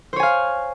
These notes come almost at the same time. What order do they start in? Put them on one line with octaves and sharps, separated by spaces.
C5 C#5 G#5 F5